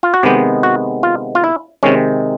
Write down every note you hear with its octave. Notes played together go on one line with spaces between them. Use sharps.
F4
F#4
C3 D#3 G#3 B3 G4
F#4
F4
F4
E4
C3 D#3 G#3 C#4